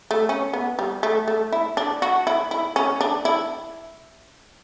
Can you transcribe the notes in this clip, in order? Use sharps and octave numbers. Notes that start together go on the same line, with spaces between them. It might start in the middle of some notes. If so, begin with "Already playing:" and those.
A3
C#4
B3
G3
A3
A3
E4
D4
F#4
E4
E4
C#4
D4
E4